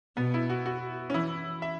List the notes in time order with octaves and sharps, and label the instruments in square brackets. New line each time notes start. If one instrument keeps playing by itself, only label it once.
[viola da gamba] B2 [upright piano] B3
[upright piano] E4
F#4
F#4
C#4
[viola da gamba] E3 [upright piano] E4
[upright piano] E5